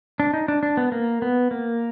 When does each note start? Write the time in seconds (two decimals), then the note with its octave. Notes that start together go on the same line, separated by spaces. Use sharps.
0.20 D4
0.34 D#4
0.48 D4
0.63 D4
0.77 B3
0.92 A#3
1.22 B3
1.51 A#3